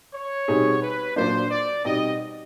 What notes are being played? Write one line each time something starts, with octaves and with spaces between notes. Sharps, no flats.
C#5
B2 G3 C4 D#4 G#4
B4
A#2 F#3 A#3 D4 C5
D5
B2 G3 C4 D#4 D#5